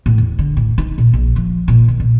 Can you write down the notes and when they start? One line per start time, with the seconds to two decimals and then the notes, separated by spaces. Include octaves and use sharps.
0.06 A2
0.18 E2
0.39 D3
0.57 A2
0.78 D#4
0.98 A#2
1.14 A#1
1.36 F3
1.68 A#2
1.88 D#3
2.00 A#2